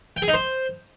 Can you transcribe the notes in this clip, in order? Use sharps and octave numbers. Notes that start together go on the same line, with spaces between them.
G5
G#4
D#4
C5